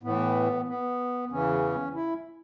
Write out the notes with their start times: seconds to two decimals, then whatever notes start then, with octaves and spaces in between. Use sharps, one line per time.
0.03 A2 E3 B3
0.68 B3
1.31 E2 C#3 E3 C#4
1.95 E4